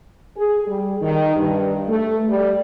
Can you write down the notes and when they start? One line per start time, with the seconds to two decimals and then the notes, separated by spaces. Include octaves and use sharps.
0.37 G#4
0.68 G3
1.02 D#3
1.35 G2
1.89 A3
2.29 G3